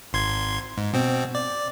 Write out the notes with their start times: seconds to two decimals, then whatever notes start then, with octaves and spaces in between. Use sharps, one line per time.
0.13 G#1 C6 G#6
0.78 G#2
0.94 B2 C4
1.35 D5